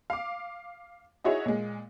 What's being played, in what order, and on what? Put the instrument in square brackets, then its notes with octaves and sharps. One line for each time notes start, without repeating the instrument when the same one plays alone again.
[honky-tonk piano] F5 D6
D#4 E4 F#4 G#4 C#5 E5
A#2 G#3